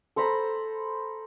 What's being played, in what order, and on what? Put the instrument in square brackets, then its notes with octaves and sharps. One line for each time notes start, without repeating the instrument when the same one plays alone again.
[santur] A4 C5 A#5 B5